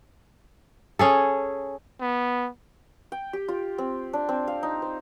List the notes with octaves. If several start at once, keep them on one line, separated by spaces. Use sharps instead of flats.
C#4 G#4 A4
B3
G5
G4
F4
C4
D4
C4
F5
D#4
C5